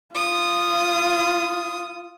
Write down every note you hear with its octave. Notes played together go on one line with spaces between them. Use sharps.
F4 D#6